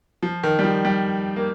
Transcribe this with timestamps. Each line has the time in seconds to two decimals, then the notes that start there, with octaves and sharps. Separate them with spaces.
0.23 F3
0.43 D#3
0.59 G3
0.64 F3
0.85 G3
1.36 A#3